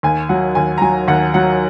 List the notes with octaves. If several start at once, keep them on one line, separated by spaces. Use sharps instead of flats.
D#2 G#5
F#3 F#5
D#2 G#5
A#5
F#3 G#5
D#2 F#5
F#3 F#5